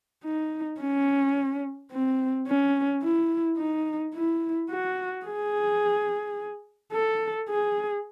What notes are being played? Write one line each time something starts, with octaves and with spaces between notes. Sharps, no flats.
D#4
C#4
C4
C#4
E4
D#4
E4
F#4
G#4
A4
G#4